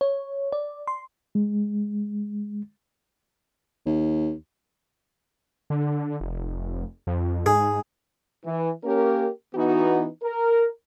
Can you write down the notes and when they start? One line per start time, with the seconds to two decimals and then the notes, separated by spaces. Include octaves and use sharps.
0.01 C#5
0.52 D5
0.87 C6
1.35 G#3
3.86 D#2
5.70 D3
6.20 F1
7.07 F2
7.46 G#2 G#4
8.44 E3
8.84 A#3 C#4 G4 A#4
9.55 E3 B3 D#4 F#4
10.23 A#4